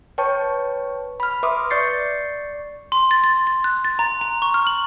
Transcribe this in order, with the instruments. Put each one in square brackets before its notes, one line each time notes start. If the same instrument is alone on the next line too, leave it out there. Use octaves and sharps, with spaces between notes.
[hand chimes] B4 C#5 G5 A5 C#6
B5 F6
B4 E5 C6 D6 D#6
D5 C#6 G6 A6 C7 C#7
[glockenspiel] C6
A6
A6
A6
F#6
A6
A#5
A#5
C#6
F6
F#7